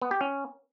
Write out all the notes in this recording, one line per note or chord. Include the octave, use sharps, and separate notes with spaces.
B3
G4
C#4